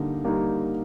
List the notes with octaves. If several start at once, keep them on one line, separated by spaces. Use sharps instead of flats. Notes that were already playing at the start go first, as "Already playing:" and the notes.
Already playing: D3 G3 A#3 D#4
G3 A#3 D#4